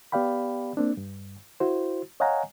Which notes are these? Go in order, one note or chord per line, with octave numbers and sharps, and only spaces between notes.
B3 G4 D5 F5 G5 B5
A#3 C4 D4
G2
E4 F#4 C5
C#5 D#5 F5 F#5 G#5 A#5